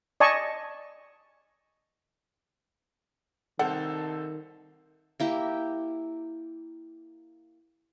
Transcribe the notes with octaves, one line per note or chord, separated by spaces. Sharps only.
D5 D#5 G#5 A5 C#6
C2 D#3 C4 A4 F#5
A#3 E4 G4